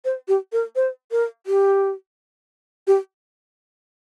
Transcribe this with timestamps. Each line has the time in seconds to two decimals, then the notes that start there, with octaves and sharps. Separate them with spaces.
0.05 C5
0.28 G4
0.52 A#4
0.76 C5
1.11 A#4
1.47 G4
2.87 G4